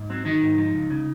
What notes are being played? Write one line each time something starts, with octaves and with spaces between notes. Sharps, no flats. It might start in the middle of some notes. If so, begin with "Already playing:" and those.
Already playing: G#2
F#3 C4
D#3 F#3 D#4
G#2
F3
C#2
C#3